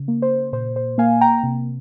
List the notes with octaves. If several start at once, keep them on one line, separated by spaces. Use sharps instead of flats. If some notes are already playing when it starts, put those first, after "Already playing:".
Already playing: C#3
A#3
C5
A#2 C5
C5
A#3 F5 G#5
G5 A#5
C3